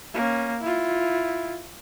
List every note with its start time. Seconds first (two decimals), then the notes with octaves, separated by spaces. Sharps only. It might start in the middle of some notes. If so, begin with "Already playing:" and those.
0.14 A#3 C#4
0.61 E4 F4